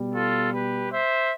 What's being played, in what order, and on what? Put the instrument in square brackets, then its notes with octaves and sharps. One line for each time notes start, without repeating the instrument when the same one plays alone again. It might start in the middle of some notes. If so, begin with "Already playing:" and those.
Already playing: [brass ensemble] B2 G3
F4 A4
G4 B4
C5 E5